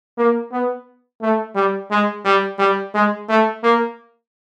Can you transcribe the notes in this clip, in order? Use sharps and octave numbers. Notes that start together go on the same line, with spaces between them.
A#3
B3
A3
G3
G#3
G3
G3
G#3
A3
A#3